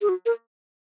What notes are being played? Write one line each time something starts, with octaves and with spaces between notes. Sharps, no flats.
G#4
F#4
A#4